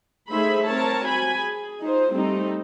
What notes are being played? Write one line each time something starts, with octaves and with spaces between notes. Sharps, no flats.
A3 D#4 G#4 C5 E5 B5
C4 A#4 C#5 A5
F#4 G#5 B5
G#4
D#4 F4 C5
G3 A3 C4 D#4